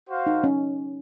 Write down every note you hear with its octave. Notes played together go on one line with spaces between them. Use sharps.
F#4 C5 F5
D#4
C#4